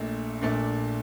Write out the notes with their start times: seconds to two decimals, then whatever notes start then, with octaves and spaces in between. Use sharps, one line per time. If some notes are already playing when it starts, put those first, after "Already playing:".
Already playing: A#1 A#2 A3 D4
0.41 A#1 A#2 A3 D4